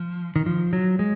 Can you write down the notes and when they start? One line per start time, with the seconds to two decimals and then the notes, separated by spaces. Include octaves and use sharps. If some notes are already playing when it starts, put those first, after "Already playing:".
Already playing: F3
0.36 D#3
0.46 F3
0.73 F#3
0.99 G#3